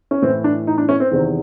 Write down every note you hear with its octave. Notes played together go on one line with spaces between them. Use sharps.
C#4
A2 E3 C4
D4
D#4
D4
C#4
C4
E2 C3 D#3 C4